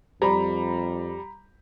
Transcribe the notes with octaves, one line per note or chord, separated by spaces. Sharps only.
F2 G3 A#5 B5